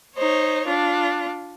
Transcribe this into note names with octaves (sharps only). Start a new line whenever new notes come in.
D#4 C5 C#5
D4 F4